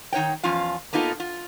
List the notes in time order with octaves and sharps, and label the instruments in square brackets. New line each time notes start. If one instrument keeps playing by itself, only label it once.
[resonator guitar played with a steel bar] D#3 D#4 C#5 G5
E2 F3 C#4 F4 F5
A#3 B3 D#4 F4 A4
F4